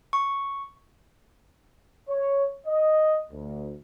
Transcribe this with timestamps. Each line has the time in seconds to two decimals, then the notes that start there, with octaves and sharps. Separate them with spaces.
0.13 C#6
2.08 C#5
2.66 D#5
3.30 D2